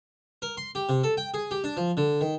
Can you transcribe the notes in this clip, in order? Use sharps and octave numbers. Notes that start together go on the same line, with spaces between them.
A#4
C6
G4
C3
A4
G5
G#4
G4
D4
F3
D3
D#3